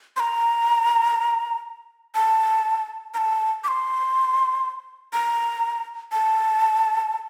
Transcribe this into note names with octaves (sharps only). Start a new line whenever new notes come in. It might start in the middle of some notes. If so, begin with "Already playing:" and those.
C6
A#5
A5
A#5
A5
D6
C6
A#5
A5